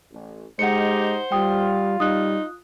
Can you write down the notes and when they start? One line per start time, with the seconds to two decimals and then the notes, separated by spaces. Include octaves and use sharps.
0.11 A1
0.59 G#3 D#4 G4 C5 F#5 C#7
1.32 G3 F4 G5 D#6
2.00 G3 D#4 D#6 F#6